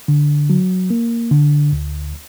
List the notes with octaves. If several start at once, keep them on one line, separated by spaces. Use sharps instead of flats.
D3
F#3
A#3
D3
D2